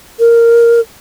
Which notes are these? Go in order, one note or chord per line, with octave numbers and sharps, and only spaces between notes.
A#4